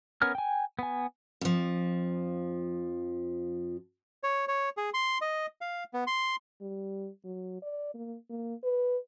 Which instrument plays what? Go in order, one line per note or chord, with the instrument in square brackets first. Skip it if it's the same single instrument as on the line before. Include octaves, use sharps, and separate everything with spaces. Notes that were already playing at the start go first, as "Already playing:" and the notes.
[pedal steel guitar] B3 C#4 A#4 G#5 F6
G5 G#5
B3 G#5
[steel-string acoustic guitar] F2 F3
[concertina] C#5
C#5
G#4
C6
D#5
F5
B3
C6
[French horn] G3
F#3
D5
A#3
A#3
B4